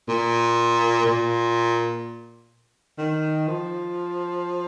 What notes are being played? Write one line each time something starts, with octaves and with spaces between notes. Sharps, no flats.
A#2
A#2
D#3
F3